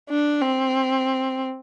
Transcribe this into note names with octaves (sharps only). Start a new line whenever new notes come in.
D4
C4